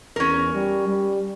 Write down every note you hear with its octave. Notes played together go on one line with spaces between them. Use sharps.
E2 C#4 A#4
G3
G3